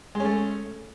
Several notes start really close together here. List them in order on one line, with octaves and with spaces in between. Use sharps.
G#3 C#4 A3